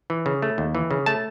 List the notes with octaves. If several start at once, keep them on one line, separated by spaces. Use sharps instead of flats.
E3
C#3
A3
D#2
E3
C#3
A3 A5